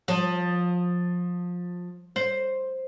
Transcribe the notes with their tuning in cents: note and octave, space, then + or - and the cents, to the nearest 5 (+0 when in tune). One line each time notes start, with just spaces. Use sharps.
F3 +20
C5 +5